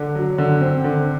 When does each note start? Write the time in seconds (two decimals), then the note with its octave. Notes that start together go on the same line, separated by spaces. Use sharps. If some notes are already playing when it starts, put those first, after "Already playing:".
Already playing: D3
0.15 F#3
0.38 D3
0.61 C4
0.84 D3